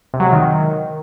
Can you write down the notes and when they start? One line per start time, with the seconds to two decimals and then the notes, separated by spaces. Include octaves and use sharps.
0.14 C3
0.20 F#3
0.26 G#3
0.33 D#3